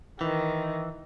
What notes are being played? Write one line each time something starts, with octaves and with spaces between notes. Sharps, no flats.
D#3 E3